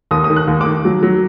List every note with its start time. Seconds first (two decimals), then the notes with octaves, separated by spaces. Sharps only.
0.11 D#2 D#6
0.24 D#6
0.30 D#3
0.36 F#6
0.47 D#2
0.61 D#3 D6
0.85 F#3
1.03 F#3